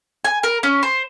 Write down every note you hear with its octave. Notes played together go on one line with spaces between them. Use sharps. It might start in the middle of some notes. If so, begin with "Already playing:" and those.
G#5
A#4
C#4
C5